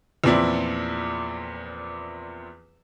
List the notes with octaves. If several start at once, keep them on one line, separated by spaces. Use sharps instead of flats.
E2 A#2 F3 C4 E4 D5